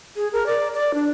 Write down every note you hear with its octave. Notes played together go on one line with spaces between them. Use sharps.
G#4
A#4
D5
D5
D4